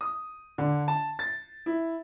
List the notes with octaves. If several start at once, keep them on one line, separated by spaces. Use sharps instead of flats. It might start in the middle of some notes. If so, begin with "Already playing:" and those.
D#6
D3
A5
A6
E4